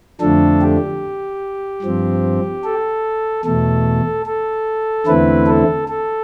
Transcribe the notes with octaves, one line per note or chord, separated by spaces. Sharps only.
F2 D3 F3 A3 D4 A4
G4
G2 F3 C4
A4
E2 B2 A3 A4
A4
E2 D3 A3 C4 E4 B4
A4
A4